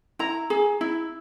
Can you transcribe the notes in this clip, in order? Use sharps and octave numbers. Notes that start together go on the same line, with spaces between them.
E4 A#5
G#4
E4